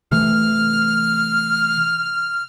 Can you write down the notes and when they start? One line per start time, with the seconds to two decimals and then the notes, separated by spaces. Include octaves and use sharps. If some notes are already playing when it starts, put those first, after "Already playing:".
0.11 C3 E3 A3 F6